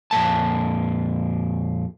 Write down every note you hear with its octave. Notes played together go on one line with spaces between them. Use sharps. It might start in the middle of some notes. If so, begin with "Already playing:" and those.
F2 A#2 A#3 A5